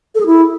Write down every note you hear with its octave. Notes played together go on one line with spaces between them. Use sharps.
A4
G#4
E4